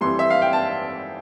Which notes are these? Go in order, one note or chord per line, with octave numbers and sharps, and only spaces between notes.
F2 E3 G3 C6
E5
F5
G5
A5